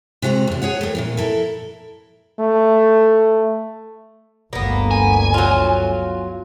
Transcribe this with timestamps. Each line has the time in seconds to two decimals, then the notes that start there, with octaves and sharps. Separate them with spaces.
0.22 C3 G#3 F#4 F#5 A#5
0.47 E2 A2
0.62 G#4 C#5 F#5
0.81 D#2 A3
0.95 A#2 C#3 E3
1.17 E4 A4 A#4
2.40 A3
4.53 G1 D2 A#3 B3
4.91 G#5
5.34 F#3 F4